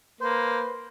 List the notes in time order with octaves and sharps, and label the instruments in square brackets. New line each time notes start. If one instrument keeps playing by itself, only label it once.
[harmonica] A#3 [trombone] B4 [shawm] C5